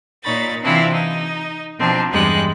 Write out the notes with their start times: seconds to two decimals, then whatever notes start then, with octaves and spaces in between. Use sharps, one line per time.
0.23 A#2 D#4 C#5 B5 A6
0.62 C3 E3 C4 D4 E4 F4
0.93 D#4
1.79 B2 F3 C4 D4 D#4
2.11 E2 G2 G3 G#3 F#6